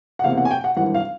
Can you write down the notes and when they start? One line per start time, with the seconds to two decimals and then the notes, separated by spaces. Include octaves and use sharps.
0.19 F#5
0.24 F#1 E2 C3 F5
0.37 F#5
0.45 G#5
0.51 G5
0.64 F#5
0.76 G#1 G2 E3 F#5
0.94 F5